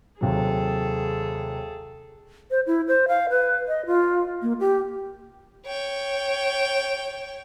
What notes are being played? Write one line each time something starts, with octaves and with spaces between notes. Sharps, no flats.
D#2 C3 F#3 G#4 A4
C5
E4
C5
F5
B4
D#5
F4
A#3
G4
C#5 G5